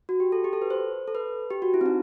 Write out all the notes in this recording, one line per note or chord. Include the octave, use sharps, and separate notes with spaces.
F#4
G4
A4
G4
A4
B4
C5
A4
B4
G4
F#4
E4
C4
D#4